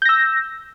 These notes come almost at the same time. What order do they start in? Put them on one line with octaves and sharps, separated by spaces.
G6 A#6 E6